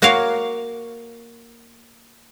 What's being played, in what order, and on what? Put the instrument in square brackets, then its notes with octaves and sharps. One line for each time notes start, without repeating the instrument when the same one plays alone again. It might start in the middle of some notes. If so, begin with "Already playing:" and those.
[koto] A#3 F#4 A#4 C#5 F5